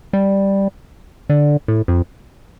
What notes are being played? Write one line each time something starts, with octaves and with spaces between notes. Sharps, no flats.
G3
D3
A2
F2